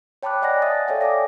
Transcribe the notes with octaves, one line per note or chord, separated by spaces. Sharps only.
C#5 G5 A5 B5 D6 F#6
D5 D#5 F#5 G#5 F#6 A#6
E5 A5 D#6 A6
A4 C#5 D5 F5 G5
G#5 D6 D#6 A#6